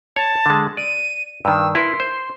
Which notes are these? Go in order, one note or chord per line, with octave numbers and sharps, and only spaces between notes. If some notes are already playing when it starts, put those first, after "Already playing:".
C#5 A5
D3 G#3
D5 D#7
G2 D#3 E6
E4 A#4 B4 C6
C5